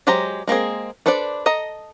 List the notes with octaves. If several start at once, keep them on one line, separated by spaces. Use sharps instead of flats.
F#3 G#3 G4 C5 A#5
G#3 A#3 C4 G#4
D4 A4 B4 C5 D5
A4 D#5 A#5